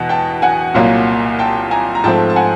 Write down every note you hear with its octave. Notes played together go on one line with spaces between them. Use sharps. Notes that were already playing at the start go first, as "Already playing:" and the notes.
Already playing: E2 B2 F#5
G5 A5
F#5 G#5
C2 A#2 F#3 A#3
G5 A5
G#5 A#5
A#5
G#2 F3 A3 C4 G5 A5
A5
F#5 G#5